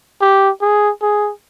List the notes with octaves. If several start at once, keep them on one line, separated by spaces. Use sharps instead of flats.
G4
G#4
G#4